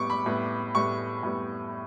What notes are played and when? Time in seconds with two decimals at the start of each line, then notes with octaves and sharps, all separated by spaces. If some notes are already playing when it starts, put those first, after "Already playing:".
Already playing: A2 G3 B3 C#6 D6
0.10 B5
0.26 A2 G3 B3
0.75 A2 G3 B3 C#6
1.23 A2 G3 B3